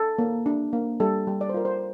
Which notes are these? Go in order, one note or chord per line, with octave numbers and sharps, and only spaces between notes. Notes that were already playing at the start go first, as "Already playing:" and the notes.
Already playing: A4
A#3
D4
A#3
G3 A4
G3
D5
C5
F4 A#4
C5